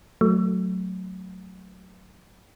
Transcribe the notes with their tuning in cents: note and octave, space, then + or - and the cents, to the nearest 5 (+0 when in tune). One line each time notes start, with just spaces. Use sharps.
F#3 +0 A3 +0